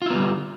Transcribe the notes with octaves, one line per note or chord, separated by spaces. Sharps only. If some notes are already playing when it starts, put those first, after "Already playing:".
D3 G3 B3 E4 F4